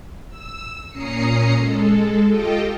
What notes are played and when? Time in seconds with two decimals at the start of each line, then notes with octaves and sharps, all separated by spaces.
0.29 E6
0.90 A#2 C#4 A#5 D#6 C7 C#7
1.56 G#3 A4
2.28 F4 G4 A4 D#5 G5